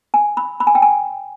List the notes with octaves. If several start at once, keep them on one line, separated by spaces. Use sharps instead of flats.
G#5
B5
B5
G#5
G5
G#5